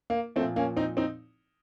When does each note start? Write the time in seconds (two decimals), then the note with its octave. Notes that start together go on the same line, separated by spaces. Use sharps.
0.10 A#3
0.36 F3 A3 C4
0.40 A#2
0.56 A#3 C#4
0.77 C4 D#4
0.97 C4 D#4